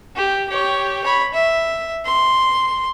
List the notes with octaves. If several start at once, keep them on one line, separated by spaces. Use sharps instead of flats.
G4
G4 C#5
C#5 B5
E5
C6